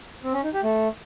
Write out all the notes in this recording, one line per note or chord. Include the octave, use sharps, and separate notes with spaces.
C4
C#4
D#4
G4
A3